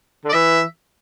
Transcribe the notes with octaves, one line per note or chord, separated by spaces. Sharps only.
D3
D5
E3 E5